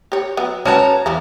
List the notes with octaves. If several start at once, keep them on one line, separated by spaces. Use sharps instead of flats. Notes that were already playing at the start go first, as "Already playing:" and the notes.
G4 C#5
F#3 B3
C#4 F#4 B4 C#5 A5 A#5
E2 E3 F3 F5